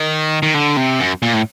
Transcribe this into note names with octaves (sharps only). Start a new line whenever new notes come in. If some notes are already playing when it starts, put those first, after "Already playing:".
Already playing: D#3
D#3
D3
C3
F#2
A#2
A2